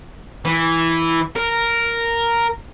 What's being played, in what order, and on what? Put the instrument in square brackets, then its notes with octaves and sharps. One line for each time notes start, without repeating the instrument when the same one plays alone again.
[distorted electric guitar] E3
A#4